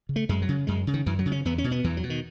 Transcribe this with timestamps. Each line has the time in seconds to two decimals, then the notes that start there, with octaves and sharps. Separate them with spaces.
0.09 C#3
0.16 A3
0.29 F#2 G#3
0.42 F#3
0.49 C#3
0.67 F#2 G#3
0.87 C#3
0.94 D#3
1.06 F#2 E3
1.19 F#3
1.26 C#3
1.32 C#4
1.45 E2 B3
1.58 C#4
1.64 B2
1.71 B3
1.84 E2 E3
1.97 F#3
2.03 B2
2.10 D#3